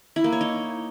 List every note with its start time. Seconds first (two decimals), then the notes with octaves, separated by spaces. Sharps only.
0.16 E4
0.24 A#3
0.33 C#5
0.41 D#4